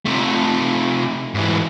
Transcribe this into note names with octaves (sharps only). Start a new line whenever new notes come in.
C3 A3
G#2 E3